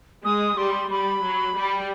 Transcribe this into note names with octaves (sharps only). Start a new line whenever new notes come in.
G#3 D#6
G3 C6
G3 B5
F#3
G3